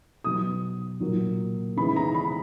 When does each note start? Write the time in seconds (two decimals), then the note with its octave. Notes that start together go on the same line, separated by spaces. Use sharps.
0.24 B2 F#3 B3 D#6
1.00 A#2 F#3 A#3
1.77 C#3 E3 G#3 B3 B5
1.96 A#5
2.14 B5